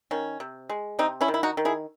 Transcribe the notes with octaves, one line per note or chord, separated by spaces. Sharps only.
D#3 C#4
C3
G#3
C3 C4 D#4
C#4 E4
D#3
E4
D#4 F#4
D#3
E4 G#4